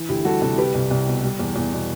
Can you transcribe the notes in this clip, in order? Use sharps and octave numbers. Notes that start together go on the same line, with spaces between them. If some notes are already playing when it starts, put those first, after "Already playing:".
Already playing: E3
D2 E4 G4
G3 F#4 A4
C3 F#4 A4
G3 G4 B4
C2
C2
B2
G3
E2
E2
B2